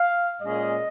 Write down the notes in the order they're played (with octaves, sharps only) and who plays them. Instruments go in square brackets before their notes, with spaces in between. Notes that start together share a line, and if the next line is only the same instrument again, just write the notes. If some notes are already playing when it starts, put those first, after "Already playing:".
Already playing: [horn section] F5
A#2 G#3 C#4 D#5